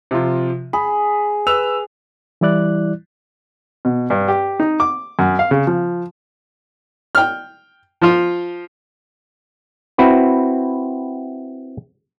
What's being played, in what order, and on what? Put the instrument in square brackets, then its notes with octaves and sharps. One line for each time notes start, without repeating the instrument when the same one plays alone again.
[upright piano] C3 F3 F4
[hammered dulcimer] G#4 [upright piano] B5
[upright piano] B4 E6 F7
[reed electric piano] E3 G3 E4 D5 F#6
[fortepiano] B2
G2
G4
D#4
D6
F#2
F5
C#3
F3
G5 F6
F3 F4
[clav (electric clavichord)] C4 E4 F#4 B4